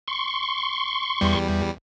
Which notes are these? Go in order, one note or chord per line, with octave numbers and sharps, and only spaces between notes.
C6 C#6
E2 G3